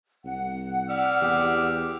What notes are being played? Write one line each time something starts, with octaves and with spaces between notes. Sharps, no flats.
C2 F#5
D5 E6 F6
E2 G4